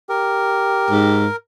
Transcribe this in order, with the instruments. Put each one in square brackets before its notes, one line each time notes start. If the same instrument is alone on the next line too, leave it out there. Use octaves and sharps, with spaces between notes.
[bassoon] G4 [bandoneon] A#4
[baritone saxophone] G#2